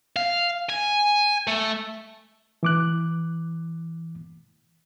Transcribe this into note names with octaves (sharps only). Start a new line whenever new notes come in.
F5
G#5
A3
E3 D6 F#6